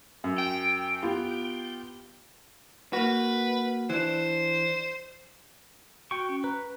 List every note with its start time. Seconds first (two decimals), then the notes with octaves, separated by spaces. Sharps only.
0.24 F#2
0.38 G5
1.02 B3 F4 G4
2.93 A#3 F#4 B4
3.90 E3 D4 C5
6.11 F#4 G5 C#6
6.29 C#4
6.44 B4 A#5